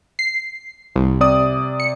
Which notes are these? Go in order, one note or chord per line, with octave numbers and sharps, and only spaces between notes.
C7
C2
C3 D5 D#6
C#7